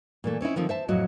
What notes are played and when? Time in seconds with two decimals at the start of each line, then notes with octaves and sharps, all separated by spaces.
0.24 A#2 E3 A3
0.41 C4 C#4 D#4 E4
0.56 D3 D#3 F3 C4
0.69 C5 E5 A5
0.88 F2 A2 F#3 F#4 D#5